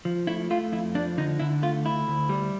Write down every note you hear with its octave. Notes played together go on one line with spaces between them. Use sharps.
F3
A3 E4
A3 F4
F2 E4
F3 D4
D3 D#4
D3 E4
A3 F4
D2 E4
D2
G3